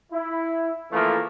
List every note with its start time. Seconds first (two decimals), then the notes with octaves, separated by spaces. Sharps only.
0.12 E4
0.91 C#3 E3 F3 A3 A#3